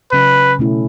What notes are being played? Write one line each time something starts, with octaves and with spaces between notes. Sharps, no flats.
C#3 F#3 C#4 B4
B2 A3 C#4 E4